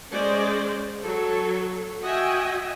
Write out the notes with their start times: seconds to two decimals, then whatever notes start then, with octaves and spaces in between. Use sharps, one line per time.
0.11 G#3 C#4 G#4 C5 D5
1.04 F#3 A4
2.01 F#4 D#5 E5 G5 G#5